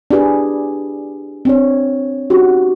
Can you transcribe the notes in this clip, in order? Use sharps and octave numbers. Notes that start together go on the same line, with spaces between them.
D4 E4 G4 G#4 B4
C4 D4 C#5
C#4 D#4 F#4 G4